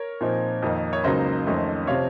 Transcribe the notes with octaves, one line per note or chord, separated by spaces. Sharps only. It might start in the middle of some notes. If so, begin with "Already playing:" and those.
Already playing: A#4 C#5
A#2 F3 C4 D#4
F2 D#3 A#3 D#4
C#5
C#2 C#3 F#3 A#3 D#4 C5 D#5
F2 D#3 A3 C#4
C3 F3 C4 C#5 F5